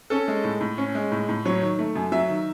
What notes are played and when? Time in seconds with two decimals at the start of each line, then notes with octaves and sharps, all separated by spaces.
0.10 C#4 A4
0.28 G#3
0.44 A2
0.61 A2
0.78 C#4
0.95 G#3
1.12 A2
1.29 A2
1.45 F#3 C#5
1.62 D#3
1.79 A3
1.96 F#2
2.12 F#3 E5
2.29 D#3